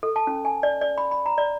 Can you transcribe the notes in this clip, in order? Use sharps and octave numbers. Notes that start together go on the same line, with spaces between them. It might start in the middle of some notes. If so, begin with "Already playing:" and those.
A4
A5
C#4
G#5
D5
D5
B5
B5
A#5
D5